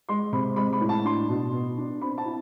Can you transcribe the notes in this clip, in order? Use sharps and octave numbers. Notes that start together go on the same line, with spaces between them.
G#3 C6
C3 B5
G#3 B5
B5
A2
A5
D4 C6
B2
B3
D4
C4 B5
A5
E4